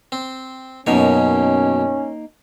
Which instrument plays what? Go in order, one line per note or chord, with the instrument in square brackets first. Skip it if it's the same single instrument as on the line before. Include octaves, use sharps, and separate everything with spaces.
[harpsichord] C4
[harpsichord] F#2 B2 C#5 [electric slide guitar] A#3 D#4 [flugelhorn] C#4